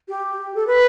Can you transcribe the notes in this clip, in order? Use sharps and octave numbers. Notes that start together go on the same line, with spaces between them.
G4
A4
B4